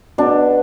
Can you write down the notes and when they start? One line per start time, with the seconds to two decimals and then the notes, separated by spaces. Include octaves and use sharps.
0.18 B2 D4